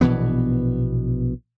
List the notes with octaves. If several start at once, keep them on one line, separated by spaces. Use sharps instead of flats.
A#1 B2 E3 B3